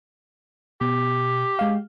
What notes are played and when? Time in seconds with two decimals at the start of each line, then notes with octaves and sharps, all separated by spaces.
0.81 B2 G4
1.59 G#3 F5